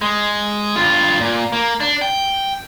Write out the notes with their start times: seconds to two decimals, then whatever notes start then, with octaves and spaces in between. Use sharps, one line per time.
0.01 G#3
0.76 G2 F4
1.21 A#2
1.52 A#3
1.80 D4
2.01 G5